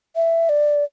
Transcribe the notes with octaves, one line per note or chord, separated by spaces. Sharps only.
E5
D5